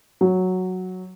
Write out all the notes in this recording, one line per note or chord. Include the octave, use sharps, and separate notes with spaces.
F#3